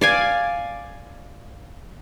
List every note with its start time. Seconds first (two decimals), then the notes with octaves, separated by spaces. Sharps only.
0.01 D5 F5 G#5